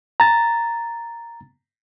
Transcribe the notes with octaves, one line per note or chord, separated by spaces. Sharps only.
A#5 A6